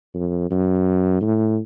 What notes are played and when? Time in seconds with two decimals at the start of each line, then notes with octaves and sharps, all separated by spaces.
0.15 F2
0.51 F#2
1.21 A2